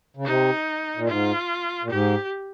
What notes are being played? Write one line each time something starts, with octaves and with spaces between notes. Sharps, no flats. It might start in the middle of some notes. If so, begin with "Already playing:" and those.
C#3
C3 D#4
A#2
G#2 F4
A#2
G#2 G4